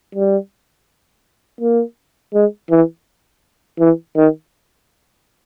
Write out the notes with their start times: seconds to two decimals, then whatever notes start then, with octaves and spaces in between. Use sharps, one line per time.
0.15 G3
1.60 A#3
2.34 G#3
2.70 E3
3.79 E3
4.16 D#3